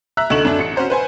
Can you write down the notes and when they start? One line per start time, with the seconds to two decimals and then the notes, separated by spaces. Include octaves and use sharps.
0.17 E5 A#5 E6 F#6
0.30 D2 D3 D#4 C#6 E7 F#7
0.45 F#2 A3 D4
0.58 A1 C#7
0.76 C#4 F#4 C5 A#5
0.90 B4 C5 G#5